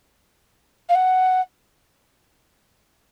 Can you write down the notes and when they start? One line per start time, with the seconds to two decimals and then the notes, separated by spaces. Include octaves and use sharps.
0.89 F5
0.95 F#5